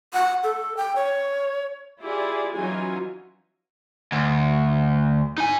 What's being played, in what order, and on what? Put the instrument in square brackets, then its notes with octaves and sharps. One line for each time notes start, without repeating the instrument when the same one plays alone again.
[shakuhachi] F#5
A4
G5
C#5
[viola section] E4 F4 G4 G#4 D5
E3 F#3 C#4 D#4 F4 G#5
[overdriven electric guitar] D2
D#4 G#5